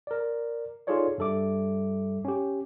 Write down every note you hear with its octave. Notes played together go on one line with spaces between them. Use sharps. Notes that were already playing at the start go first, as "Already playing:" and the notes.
A#4 D5
D#4 F4 G#4 A4 C#5 D5
G2 G3 A4 E5 D6
C#4 G4